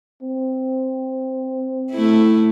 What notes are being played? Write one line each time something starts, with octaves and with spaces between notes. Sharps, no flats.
C4
A3 E4